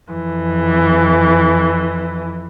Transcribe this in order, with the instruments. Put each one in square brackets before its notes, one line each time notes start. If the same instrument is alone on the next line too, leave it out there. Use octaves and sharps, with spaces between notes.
[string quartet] F2 E3